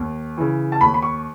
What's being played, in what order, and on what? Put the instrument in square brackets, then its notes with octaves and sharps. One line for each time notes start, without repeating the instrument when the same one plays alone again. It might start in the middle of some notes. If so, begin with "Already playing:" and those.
Already playing: [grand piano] D#2
C#3 E3
A5
D#2 B5
B5
C#6